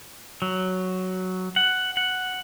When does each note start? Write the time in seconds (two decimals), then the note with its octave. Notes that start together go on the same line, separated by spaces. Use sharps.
0.42 F#3
1.56 F#5
1.97 F#5